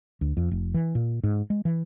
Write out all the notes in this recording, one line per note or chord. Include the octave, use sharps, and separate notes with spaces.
D2
F2
F1
E3
A#2
G#2
G#3
E3